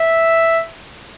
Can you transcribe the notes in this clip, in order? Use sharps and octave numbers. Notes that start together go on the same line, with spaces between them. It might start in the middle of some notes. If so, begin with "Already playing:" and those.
Already playing: E5